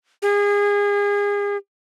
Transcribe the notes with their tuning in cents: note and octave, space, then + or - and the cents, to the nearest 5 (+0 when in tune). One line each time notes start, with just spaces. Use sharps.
G#4 -30